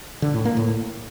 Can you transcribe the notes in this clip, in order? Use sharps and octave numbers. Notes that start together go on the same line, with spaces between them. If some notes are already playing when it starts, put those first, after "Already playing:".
D3
A2
A#3
A2